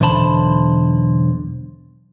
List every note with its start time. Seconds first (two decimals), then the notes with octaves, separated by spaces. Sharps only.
0.01 B1 E2 D3 C5 A5 B5